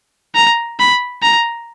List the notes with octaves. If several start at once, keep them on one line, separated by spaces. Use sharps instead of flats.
A#5
B5
A#5